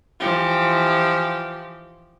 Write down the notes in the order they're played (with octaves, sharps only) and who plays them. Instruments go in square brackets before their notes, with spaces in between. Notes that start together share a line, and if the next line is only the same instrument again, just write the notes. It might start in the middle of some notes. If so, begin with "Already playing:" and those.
[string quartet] E3 F3 G4